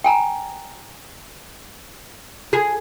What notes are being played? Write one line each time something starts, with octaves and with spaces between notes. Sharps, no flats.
G5 G#5 A#5
G#4